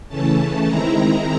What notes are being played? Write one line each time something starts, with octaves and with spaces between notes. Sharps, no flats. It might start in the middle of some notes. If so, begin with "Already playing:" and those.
C#3 E3 A3 C#4 A5
D#3 G#3 C4 E4 A#5